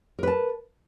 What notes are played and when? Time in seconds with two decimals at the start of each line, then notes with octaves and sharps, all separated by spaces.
0.19 A#4
0.23 B4
0.27 A5